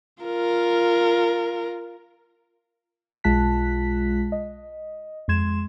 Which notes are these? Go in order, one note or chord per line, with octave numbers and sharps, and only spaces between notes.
F4 A#4
B1 G#3 F4 A5 F#6 B6
D#5
F2 G#3 C6 G#6 E7